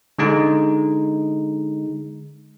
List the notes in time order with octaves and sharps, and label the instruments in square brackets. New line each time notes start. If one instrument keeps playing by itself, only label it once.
[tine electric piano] D3 G#3 D#4